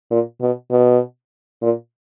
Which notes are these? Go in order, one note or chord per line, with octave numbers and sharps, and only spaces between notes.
A#2
B2
B2
A#2